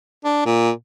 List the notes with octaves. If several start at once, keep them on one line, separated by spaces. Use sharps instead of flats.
D4
A#2